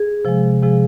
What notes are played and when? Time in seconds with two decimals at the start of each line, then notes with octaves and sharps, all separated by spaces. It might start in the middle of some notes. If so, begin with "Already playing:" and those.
Already playing: G#4
0.25 C3 F3 G#3
0.63 C3 F3 G#3 G#4